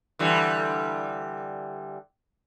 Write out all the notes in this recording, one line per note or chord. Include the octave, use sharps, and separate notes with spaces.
D3 E3 G3